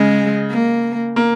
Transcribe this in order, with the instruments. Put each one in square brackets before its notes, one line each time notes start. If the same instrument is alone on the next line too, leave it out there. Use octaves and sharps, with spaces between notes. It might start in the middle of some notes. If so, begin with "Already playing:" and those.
Already playing: [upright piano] C#3 [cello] G#3
[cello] A#3
[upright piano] A#3